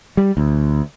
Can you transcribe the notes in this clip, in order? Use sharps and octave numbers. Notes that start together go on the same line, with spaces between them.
G3
D2